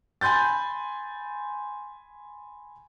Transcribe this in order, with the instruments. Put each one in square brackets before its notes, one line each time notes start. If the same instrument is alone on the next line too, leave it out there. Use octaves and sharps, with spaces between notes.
[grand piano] G#5 B5 C6 G6 A6